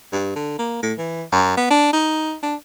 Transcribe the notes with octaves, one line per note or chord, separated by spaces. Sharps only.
G2
D3
A#3
A2
E3
F#2
B3
D4
D#4
D4